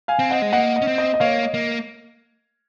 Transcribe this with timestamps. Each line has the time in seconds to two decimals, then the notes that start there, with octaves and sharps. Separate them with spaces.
0.08 F5 G#5
0.19 C4
0.30 D#5 F#5
0.42 G#3
0.53 A#3 D#5 F#5
0.76 D#5
0.82 C#4
0.87 C4
0.98 D#5
1.14 D#5
1.20 A#3 C#5 F5
1.43 D#5
1.54 A#3